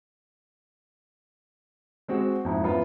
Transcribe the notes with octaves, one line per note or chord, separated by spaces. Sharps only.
G#3 C4 F#4
F2 G#2 E4
F#2 B3 C#4 E4 F4